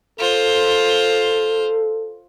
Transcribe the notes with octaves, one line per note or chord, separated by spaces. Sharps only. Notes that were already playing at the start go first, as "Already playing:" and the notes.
F4 A4 C5